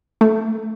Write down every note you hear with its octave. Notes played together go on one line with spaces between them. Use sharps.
A3